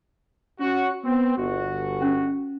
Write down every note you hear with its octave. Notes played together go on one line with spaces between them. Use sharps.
C#4 F#4
B3 C4
G1 F#4
C#4